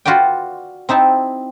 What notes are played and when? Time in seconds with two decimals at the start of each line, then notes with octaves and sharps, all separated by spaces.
0.05 F4 F#4 B4 D5 G5
0.89 C4 D#4 E4 A5